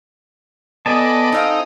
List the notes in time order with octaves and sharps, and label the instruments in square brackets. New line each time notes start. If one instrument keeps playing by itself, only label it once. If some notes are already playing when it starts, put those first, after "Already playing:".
[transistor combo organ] B3 D5 [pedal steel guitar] A4 G#5 A5 [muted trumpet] D#5
[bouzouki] C4 F5 [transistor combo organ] D#4